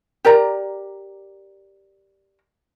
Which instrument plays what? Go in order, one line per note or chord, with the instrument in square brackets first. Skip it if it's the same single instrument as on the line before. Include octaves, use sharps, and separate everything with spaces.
[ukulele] G4 A#4 D5 A#5